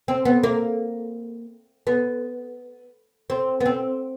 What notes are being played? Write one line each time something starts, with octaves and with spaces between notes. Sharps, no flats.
C4
B3
A#3
B3
C4
B3
C4